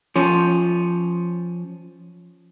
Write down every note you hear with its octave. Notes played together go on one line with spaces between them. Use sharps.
F3 C#4